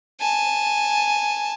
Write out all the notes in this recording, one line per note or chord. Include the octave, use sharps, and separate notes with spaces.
G#5 A5